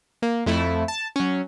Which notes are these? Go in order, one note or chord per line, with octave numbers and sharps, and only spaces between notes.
A#3
F2 A3 E4
A5
F#3 C#4